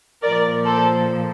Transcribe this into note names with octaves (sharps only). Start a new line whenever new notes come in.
A#2 F3 A#4 D5
A4 C5